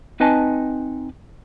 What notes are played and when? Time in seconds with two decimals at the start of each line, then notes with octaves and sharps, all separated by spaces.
0.20 C4 D#4 B4 D#5 G#5 A5